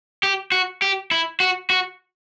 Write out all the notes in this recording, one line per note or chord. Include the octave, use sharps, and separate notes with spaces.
G4
F#4
G4
E4
F#4
F#4